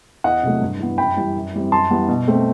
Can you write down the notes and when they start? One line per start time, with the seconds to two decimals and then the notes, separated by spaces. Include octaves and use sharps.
0.24 E2 D#5 F#5
0.43 C3 F#3 A3
0.62 G2
0.80 E3 B3
0.98 F#2 G5 B5
1.17 E3 G3
1.35 F#2
1.54 E3 G3 C4
1.72 F#2 A5 C6
1.91 E3 G3 B3
2.09 B2
2.27 A3 C4